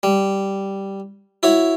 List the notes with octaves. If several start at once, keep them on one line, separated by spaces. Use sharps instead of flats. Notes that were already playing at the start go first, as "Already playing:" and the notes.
G3
E4 F#4 C#5